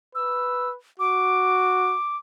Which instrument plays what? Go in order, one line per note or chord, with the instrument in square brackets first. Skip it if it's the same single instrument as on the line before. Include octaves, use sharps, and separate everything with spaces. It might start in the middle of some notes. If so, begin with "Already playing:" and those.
[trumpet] B4 [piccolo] E6
[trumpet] F#4 [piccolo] D6